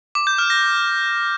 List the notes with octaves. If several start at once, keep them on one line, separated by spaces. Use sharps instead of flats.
D6
G6
F6
A#6